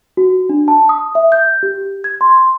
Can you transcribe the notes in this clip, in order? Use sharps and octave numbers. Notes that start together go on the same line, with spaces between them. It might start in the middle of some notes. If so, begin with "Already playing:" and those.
F#4
D4
A5
D#6
E5
G6
G4
G#6
C6